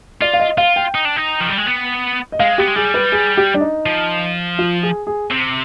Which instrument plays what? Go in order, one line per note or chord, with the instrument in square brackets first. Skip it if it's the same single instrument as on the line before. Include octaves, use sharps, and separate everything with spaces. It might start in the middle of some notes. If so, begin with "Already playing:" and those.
[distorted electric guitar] F4 [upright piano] D5
[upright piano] F5
D#5
[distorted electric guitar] F4 [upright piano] F5
[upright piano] G5
[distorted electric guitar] D#4
D4
D#4
F3
G3
G#3
B3
[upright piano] D#5
[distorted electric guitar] G#3 [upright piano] F5
[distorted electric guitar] B3 [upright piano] G4
[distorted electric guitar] G#3
[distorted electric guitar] G3 [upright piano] G#4
[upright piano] B4
G#4
G4
D4
D#4
[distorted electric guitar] F3
[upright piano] F4
G#4
G#4
[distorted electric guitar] C3